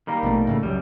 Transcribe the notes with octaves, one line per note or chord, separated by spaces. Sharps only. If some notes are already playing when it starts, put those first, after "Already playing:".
D#3 G3 A#3
A#1 B2 A3
A2 C#3 A3
C#2 F#2 G3